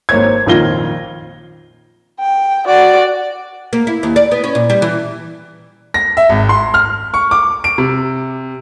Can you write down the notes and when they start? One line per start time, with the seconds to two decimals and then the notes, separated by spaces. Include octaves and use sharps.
0.09 G#1 A#3 C5 C#5 G#6
0.46 A#1 F2 D#3 F4 A#6 G7
2.20 G5
2.67 F#4 D5
3.73 A#3
3.87 E4
4.03 D#2
4.16 D5
4.32 B3
4.44 C#4
4.55 A#2
4.70 G3
4.82 E3
5.94 A#6
6.17 E5
6.29 G#1
6.49 C6
6.74 F6
7.14 C#6
7.31 D6
7.64 D7
7.78 C3